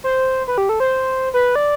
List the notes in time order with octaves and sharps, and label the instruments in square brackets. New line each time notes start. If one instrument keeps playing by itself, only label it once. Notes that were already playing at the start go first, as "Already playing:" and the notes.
[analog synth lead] C5
B4
G4
A4
C5
B4
D5